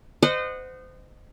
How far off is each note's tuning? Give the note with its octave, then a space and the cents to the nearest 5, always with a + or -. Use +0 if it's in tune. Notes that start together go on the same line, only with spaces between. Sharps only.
C5 -30 D#5 -25 F#5 -10